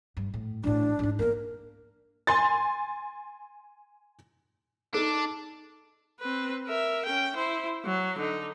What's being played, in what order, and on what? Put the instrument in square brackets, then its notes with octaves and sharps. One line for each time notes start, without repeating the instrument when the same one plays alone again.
[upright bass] G2
A2
[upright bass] A1 A2 [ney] D4
[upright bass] G#2 D#4
[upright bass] A#3 B3 [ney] A#4
[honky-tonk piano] G#5 C6 A6
[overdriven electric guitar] D4 [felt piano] D#4 A4
[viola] C4 B4
A#4 E5
C#4 G5
E4 C5
F#3
D3 D#4